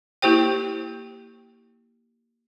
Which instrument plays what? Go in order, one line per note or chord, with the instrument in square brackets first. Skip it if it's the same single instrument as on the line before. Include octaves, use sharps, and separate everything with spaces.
[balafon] A#3 E4 G4 C5 G5